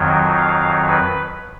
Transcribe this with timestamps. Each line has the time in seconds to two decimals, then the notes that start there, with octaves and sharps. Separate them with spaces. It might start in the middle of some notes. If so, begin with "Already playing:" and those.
Already playing: F2 D#3 F#3
0.37 F5
0.88 B4